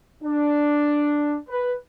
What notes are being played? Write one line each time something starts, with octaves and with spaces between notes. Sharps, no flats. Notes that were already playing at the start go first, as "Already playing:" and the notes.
D4
B4